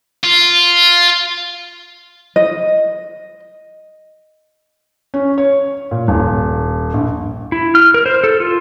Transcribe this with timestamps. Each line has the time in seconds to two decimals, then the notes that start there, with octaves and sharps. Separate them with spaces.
0.24 F4
2.36 D#5
5.14 C#4
5.38 C#5
5.91 A#2
6.08 D#1
6.94 A#1
7.52 E4
7.75 F6
7.94 A#4
8.06 C5
8.24 A4
8.40 F4